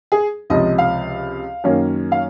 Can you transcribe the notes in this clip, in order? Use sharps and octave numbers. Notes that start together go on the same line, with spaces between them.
G#4
C#2 C3 F3 D#5
F5
F#2 D#3 A#3 C#4
F5